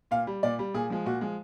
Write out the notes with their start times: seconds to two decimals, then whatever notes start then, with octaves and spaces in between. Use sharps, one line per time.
0.11 A#2 F5
0.27 G3
0.43 A#2 D5
0.59 G3
0.74 A#2 G#4
0.90 F3 G#3
1.06 A#2 F#4
1.21 F3 G#3